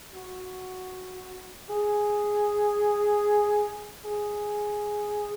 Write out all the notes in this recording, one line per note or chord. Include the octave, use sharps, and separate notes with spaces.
F#4
G#4
G#4